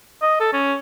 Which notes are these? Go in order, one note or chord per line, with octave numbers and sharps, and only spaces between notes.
D#5
A4
C#4